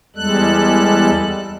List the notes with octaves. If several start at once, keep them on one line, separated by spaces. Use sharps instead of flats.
E2 G3 G#3 A4 F#6